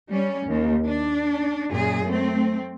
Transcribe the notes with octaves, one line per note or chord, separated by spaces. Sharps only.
G3 C#4
D#2
D4
F#2 A#2 G#4
A3 C4